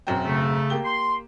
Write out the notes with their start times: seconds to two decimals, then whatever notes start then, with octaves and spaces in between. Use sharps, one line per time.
0.07 E1 F#2 C4
0.26 C#3 A3
0.70 A#3 G4 G7
0.85 C6